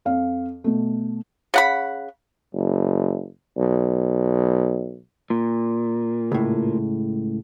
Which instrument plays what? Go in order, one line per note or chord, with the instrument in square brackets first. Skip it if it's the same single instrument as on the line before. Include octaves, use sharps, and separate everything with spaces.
[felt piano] F2 F5
B2 A3
[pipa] C#3 F#5 B5
[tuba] F#1
B1
[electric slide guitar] A#2
[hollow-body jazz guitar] C#2 A2